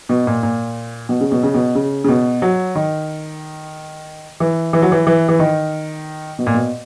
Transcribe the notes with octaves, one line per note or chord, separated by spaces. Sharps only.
B2
A#2
A#2
B2
C#3
B2
C#3
B2
C#3
C#3
B2
F#3
D#3
E3
E3
F#3
E3
E3
E3
D#3
B2
A#2
B2